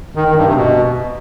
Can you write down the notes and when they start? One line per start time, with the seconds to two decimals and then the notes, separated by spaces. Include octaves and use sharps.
0.15 D#3
0.26 D#3
0.36 G2
0.46 C3
0.56 B2